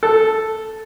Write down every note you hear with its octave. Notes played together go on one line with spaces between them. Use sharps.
A4